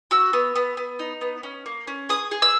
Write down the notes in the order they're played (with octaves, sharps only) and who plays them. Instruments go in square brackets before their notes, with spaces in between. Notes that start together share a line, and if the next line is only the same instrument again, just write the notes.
[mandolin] F#4 E6
B3
B3
B3
D#4
B3
C#4
A#3
C#4
G#4 D#6
G#4
E6